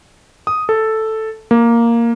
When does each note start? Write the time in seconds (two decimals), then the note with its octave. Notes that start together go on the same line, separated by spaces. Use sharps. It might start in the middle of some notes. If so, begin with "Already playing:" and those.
0.47 D#6
0.69 A4
1.51 A#3